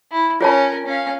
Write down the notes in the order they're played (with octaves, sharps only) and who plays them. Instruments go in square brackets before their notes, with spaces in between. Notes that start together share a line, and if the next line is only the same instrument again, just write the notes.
[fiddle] E4
[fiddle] C#4 A#4 [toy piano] F4 C#5 A5
[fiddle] C#4 F5